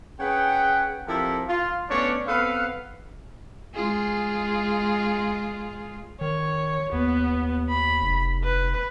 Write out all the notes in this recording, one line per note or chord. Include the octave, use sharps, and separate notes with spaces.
C#4 G#4 B4 F#5 G5
F3 C4 E4 G4 A4 A#4
F4
A3 B3 C#4 D4 C#5 D5
B3 C4 A4 B4 F5
G#3 F4 G#4
D#3 C#5
D#2 B3
B5
F1
B4